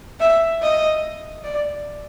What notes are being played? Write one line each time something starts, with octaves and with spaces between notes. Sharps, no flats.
E5
D#5
D5